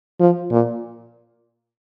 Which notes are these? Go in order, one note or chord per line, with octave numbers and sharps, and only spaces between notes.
F3
A#2